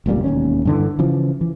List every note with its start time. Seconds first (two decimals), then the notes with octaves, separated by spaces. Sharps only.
0.06 F1 C#2 A#2 G3
0.24 E1 D#2 C#4
0.65 G2 D3 E3
0.99 C#3 E3 F3
1.41 E3